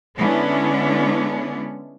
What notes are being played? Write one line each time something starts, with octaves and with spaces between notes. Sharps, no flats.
D3 G#3 B3 C#4 D4 E4